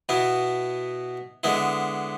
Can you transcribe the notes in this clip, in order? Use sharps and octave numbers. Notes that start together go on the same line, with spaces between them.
B2 B3 E4
D3 G#3 B3 E4